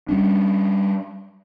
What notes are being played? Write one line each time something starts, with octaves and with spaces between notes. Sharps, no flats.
G3 C#4 D4